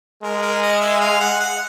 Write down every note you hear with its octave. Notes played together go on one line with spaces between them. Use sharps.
G#3 A#4
A#4
D#5
E5
F5
F#5
F#5